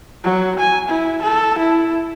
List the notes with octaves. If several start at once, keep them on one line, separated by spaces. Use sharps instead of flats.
F#3
G#5
E4
A4
E4